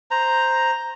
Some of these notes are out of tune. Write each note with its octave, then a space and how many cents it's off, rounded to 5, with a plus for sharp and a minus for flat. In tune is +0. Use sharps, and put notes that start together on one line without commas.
C5 +0 A#5 +0